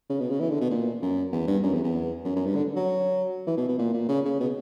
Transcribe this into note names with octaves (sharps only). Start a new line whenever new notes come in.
C#3
B2
C#3
E3
D3
B2
A#2
F#2
E2
G2
F#2
E2
E2
F#2
F#2
G2
D3
F#3
E3
B2
B2
A#2
A#2
C#3
C#3
B2